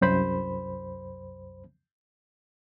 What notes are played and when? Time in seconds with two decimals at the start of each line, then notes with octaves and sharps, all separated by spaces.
0.01 C2 F#2 C5 B5